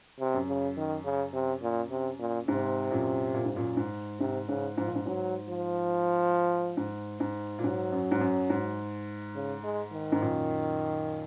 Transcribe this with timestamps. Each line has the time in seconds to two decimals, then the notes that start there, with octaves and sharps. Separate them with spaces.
0.19 C3
0.34 F#2
0.48 C#3
0.77 D#3
1.05 C#3
1.34 C3
1.62 A#2
1.91 C3
2.20 A#2
2.48 G#2 C3
2.91 F#2 A#2
3.34 A#2
3.45 G#2
3.56 F#2 A#2
3.77 G#2
4.20 G#2 C3
4.48 G#2 C#3
4.77 G#2 F3
4.86 A#2
4.96 G#2
5.06 G#2 F#3
5.49 F3
6.77 G#2
7.20 G#2
7.59 A#2
7.64 G#2 F#3
7.92 F#2
8.11 G#2
8.21 F#2
8.50 G#2
9.35 C#3
9.64 G#3
9.93 D#3
10.12 G#2
10.21 F#2 A#2